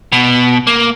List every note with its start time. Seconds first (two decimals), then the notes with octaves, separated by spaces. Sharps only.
0.12 B2
0.67 A#3